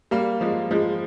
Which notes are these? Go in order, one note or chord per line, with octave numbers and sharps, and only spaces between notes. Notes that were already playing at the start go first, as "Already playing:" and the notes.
G3 A#3
F3 G#3
F3 G#3